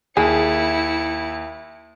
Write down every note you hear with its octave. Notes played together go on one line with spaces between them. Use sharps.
D#2 E4 G#4 C#7